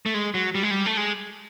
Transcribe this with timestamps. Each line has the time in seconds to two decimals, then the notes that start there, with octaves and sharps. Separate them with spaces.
0.06 A3
0.14 G#3
0.34 F#3
0.55 G3
0.63 G#3
0.71 G3
0.86 A3
0.97 G#3